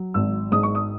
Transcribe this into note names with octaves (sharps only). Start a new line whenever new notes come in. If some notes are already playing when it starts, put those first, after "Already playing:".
Already playing: F#3
G#1 E6
G#2 D#6
C#6
D#6